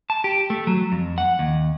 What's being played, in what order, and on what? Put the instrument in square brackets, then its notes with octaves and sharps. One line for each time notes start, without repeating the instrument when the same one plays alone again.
[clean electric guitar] A5
G4
A3
F#3
F2
F#5
D#2